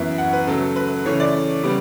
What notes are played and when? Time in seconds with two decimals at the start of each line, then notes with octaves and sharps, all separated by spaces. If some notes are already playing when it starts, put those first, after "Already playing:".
Already playing: F#2 E3 B3 E5
0.18 F#5
0.33 B4
0.47 C#3 F#3 A3 A4
0.62 A4
0.76 B4
1.05 C#3 E3 A3 C#5
1.20 D5
1.63 C#3 G3 B3